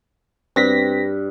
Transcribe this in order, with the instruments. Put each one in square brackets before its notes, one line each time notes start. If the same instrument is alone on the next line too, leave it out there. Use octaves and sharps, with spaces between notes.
[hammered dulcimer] G2 [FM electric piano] C4 A#6 B6